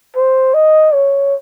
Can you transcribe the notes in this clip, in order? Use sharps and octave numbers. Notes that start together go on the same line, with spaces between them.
C5
D#5
C#5